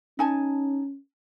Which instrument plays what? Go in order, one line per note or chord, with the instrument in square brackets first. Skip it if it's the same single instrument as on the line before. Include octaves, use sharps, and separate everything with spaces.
[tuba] C#4 [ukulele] D#4 G#5 A5